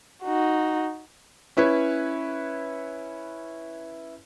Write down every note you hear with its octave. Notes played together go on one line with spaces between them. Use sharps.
D#4 F#4
C#4 E4 B4 C#5